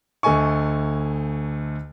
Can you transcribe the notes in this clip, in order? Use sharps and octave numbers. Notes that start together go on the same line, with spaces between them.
D2 A3 D#5 G#5 C#6